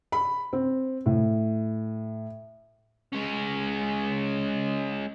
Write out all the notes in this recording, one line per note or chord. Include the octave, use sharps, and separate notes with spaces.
B5
C4
A2
G#3 C#4